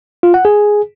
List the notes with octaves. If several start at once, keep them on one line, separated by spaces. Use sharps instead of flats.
F4
F#5
G#4